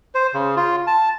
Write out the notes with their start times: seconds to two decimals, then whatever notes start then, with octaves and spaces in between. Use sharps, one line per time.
0.15 C5
0.34 C#3
0.57 F4
0.87 A5